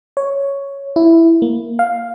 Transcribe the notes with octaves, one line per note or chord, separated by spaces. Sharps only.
C#5
E4
A#3
F5